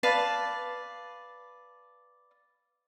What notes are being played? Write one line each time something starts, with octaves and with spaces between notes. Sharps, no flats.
B4 D5 F5 A5